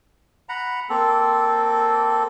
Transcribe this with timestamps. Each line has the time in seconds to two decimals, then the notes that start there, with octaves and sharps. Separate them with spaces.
0.49 F#5 A#5 B5
0.89 A#3 C4 A4